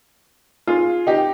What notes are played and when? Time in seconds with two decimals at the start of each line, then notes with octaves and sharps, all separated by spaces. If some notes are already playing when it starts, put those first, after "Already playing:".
0.67 F4 G#4
1.07 D#4 G4